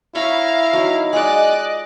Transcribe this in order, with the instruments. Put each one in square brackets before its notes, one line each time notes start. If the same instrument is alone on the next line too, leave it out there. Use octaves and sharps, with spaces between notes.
[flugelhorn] E4 [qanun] C#5 B5 C#6 [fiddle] F5 A#5
[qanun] F#3 D#4
[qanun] G#3 F4 D6 [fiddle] D5 F#6 [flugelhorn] D#5